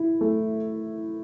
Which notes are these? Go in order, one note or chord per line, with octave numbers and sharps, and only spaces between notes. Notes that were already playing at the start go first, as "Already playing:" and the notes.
Already playing: E4
A3